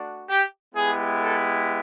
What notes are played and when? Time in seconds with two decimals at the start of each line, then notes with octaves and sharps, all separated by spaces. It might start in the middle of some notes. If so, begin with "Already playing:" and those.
Already playing: A3 D4 F#4
0.27 G4
0.74 G#3 B3 E4 G4 G#4
1.19 A4